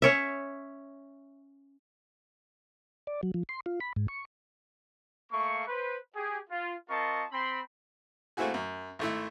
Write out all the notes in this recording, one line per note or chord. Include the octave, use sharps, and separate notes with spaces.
C#4 C#5 E5
D5
F#3
F3
C6
F4
B5
G#2
C#6
A3 A#3 F5 C#6
B4 C5
G4 G#4
F4
C4 F4 A#4 D#5 A5 C#6
C4 B5 C6
A3 A#3 C4 E4 F#4 G#4
F#2
G#1 A3 E4